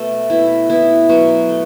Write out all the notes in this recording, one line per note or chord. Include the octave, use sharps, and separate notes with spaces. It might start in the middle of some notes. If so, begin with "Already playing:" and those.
Already playing: B2 A3 A4
B2 E4
B3 E4
B2 F#3 F#4
A3